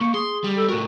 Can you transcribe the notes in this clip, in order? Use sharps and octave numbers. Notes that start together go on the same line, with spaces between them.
A#3 C#6
G#4 C6
G3
A4
A2 F#4 A#4